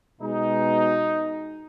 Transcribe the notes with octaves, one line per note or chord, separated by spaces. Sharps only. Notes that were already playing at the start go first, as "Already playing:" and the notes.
B2 G#3 D#4